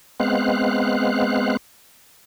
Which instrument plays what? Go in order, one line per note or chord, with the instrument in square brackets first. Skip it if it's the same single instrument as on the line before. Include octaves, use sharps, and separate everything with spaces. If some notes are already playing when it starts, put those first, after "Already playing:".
[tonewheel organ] G#3 B3 C4 F5 F#6